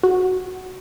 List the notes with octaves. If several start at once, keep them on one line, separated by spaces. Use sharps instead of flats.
F#4